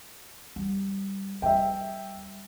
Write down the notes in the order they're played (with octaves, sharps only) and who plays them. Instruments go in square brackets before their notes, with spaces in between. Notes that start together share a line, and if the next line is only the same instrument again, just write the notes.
[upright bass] G3
[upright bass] G3 [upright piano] E5 G5